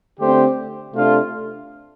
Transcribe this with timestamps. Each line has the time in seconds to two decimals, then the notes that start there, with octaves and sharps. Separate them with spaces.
0.20 D3 A3 C4 G4 C5
0.93 C3 A3 D4 F4 A4